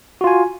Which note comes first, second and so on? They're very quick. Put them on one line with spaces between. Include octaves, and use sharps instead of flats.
F#4 F4 G#5